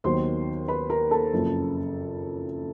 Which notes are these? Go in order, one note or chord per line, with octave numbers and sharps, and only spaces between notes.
D#2 D#3 F#3 B3 C5 C6
B4 B5
A#4 A#5
A4 A5
F#1 F2 C#3